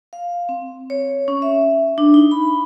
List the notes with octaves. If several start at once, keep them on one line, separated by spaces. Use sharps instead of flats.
F5
C4
C#5
C#4
E5
D4
D#4
B5